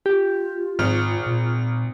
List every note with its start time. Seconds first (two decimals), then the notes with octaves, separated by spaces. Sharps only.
0.06 F4 G4
0.79 G#1 G#2 F6
1.26 A#2